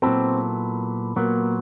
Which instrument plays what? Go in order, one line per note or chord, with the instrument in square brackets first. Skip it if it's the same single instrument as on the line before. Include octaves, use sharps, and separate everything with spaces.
[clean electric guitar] A#2 F#3 B3 E4 A4 [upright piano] C4
[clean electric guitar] A#2 F#3 B3 [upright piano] A#3